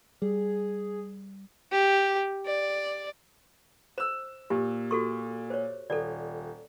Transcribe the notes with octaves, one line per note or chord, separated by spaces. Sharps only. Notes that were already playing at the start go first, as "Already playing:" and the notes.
G3 G#4
G4
D5
C5 E6 E7
A#2 G4
F#4 A4 C#6
C5 C#5
D#1 A4 D5